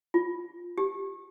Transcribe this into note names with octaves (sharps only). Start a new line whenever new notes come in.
F4
G4